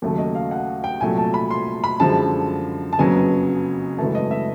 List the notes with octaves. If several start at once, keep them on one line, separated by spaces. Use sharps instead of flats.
D#2 C#3 F#3 A3
D#5
F5
F#5
G5
C2 A#2 F#3 A3 G#5
A5
B5
C6
B5
F#2 D3 F3 G#3 A5
A5
F#1 F2 C#3 F#3 B3 G#5
G#1 F#2 C#3 E3 A3 A5
D#5
E5